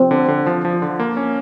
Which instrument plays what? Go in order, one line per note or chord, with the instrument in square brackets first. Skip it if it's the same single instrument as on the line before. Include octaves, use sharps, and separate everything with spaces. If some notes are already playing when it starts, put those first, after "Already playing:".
Already playing: [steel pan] C4
[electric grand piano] D3
D3
F3
F3
D3
A#3
C#4